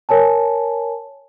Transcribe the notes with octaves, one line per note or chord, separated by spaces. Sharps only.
A#4 C#5 G#5 A5